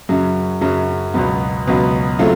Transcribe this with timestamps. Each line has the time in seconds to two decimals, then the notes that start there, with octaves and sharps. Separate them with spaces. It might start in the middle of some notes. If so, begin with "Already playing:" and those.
0.09 F#2 C#3 F#3
0.61 F#2 C#3 F#3
1.14 C#2 B2 F#3 B3
1.67 C#2 B2 F#3 B3
2.19 C#3 F#3 A3 C4 F4